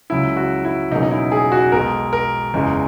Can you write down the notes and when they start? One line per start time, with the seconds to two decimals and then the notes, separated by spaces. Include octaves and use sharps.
0.10 C#2 C#3 F#3 E4
0.37 F#4
0.65 E4
0.91 E1 E2 C#3 F#3 A#3 D#4
1.03 D#4
1.11 E4
1.32 G#4
1.52 F#4
1.72 B1 B2 G#3 A#4
2.13 A#4
2.54 F#1 E2 C#3 G#3